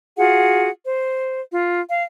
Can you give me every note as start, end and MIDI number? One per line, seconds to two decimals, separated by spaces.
0.17 0.69 65
0.17 0.69 66
0.17 0.69 68
0.17 0.69 78
0.87 1.41 72
1.54 1.82 65
1.89 2.04 77